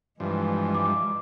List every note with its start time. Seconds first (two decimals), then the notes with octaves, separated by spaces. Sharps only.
0.20 G2 E3 F3 G#3
0.75 D6